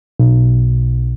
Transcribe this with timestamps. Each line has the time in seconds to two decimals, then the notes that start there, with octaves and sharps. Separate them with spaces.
0.19 B1